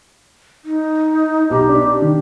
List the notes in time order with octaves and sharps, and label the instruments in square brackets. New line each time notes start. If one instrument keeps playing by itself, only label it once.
[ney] D#4
[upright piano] B1 A#5 [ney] G4
[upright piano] D4
D#3